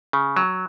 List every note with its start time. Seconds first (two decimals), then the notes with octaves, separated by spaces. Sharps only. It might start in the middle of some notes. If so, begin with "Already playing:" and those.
0.13 C#3
0.37 F#3